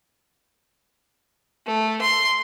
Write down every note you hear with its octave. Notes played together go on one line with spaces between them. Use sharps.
A3
C6